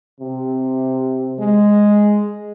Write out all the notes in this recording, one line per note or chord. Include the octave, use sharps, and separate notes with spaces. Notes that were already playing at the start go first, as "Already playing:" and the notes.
C3
G#3